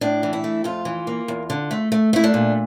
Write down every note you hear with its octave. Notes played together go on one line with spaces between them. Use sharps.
A2 D4
E3
E4
A3
F2 F4
E3
A#3
E2
D3
A3
A3
A3 E4
D4
A#2